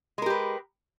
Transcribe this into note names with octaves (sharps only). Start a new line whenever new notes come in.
G#3 G4 A#4 B4